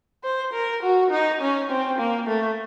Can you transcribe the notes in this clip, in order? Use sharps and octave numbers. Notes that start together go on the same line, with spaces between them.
C5
A#4
F#4
D#4
C#4
C4
A#3
A3